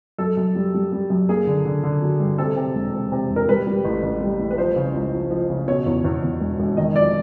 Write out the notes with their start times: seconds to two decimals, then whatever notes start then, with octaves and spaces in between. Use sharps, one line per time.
0.18 F#2 A4
0.37 F#2
0.55 G3
0.74 G3
0.92 G3
1.10 F#2
1.29 A#3 G#4
1.47 D3
1.65 D3
1.83 D3
2.02 F#3
2.20 G2
2.38 C3 A4
2.57 C3
2.75 E1
2.93 C3
3.12 C3
3.31 E1
3.36 A#4
3.48 G3 B4
3.67 G3
3.85 A1
4.03 A1
4.21 G3
4.39 A2
4.51 B4
4.58 F3 C5
4.76 C#3
4.94 C#2
5.13 F3
5.30 F3
5.50 C#3
5.68 B2 C#5
5.86 E2
6.05 E2
6.23 E2
6.40 E1
6.60 E1
6.77 D#3 D#5
6.96 F2 D5